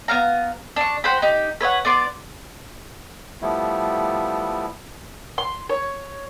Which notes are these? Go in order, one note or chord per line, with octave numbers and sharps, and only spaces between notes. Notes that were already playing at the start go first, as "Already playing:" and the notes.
B3 C4 F5 A#5
D4 C#6
F#4 C5 G5 B5
D#4 G4
B4 C#5 D#5 F#5
B3 D5 C6 D6
F3 G3 A3 B3 E4
C6
C#5